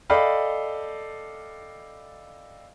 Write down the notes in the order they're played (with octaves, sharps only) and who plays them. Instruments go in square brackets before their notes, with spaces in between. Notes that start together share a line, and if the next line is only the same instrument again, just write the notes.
[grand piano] A4 D5 D#5 F5 G5 B5